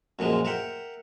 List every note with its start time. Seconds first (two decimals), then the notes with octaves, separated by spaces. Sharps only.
0.19 F#2 A#2 F3 G#3
0.45 A#4 E5 F#5 G5